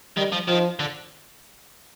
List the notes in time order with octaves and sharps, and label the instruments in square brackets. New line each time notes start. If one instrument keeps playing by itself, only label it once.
[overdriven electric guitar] D#3 [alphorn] G3
[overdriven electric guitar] F3
[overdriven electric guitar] D#3 [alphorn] F3
[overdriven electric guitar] D3